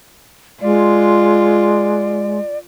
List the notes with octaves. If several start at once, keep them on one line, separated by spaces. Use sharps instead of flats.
G#3 F4 D5